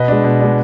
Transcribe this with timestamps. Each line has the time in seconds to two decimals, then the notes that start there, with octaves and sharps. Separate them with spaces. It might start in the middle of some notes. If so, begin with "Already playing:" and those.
Already playing: B2 B4 D#5
0.08 G#3 D4
0.24 B2
0.40 G#3 D4